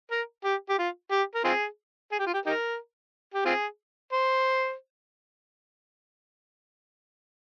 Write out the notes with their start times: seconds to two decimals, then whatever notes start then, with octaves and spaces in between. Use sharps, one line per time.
0.11 A#4
0.44 G4
0.69 G4
0.79 F4
1.11 G4
1.35 A#4
1.44 C4 F4 G#4
2.12 G#4
2.19 G4
2.27 F4
2.34 G4
2.46 D#4 G4 A#4
3.34 G4
3.45 C4 F4 G#4
4.13 C5